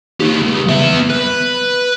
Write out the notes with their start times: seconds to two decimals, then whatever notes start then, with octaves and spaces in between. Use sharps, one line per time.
0.21 D#4 G4
0.42 C#2
0.69 B3 E5
1.10 B4